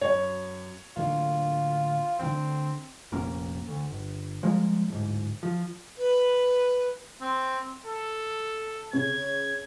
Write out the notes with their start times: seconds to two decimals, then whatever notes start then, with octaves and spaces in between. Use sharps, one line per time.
0.01 F#2 C#5
0.96 D1 D3 A#3 F4
2.19 D2 D3 C4
3.12 F1 A#1 A#3 C#4
3.68 D2
3.91 G1
4.43 F3 G3 G#3 A#3
4.88 D1 G#2
5.43 F3
5.98 B4
7.22 C4
7.86 A4
8.93 C#3 C#4 C#5 G#6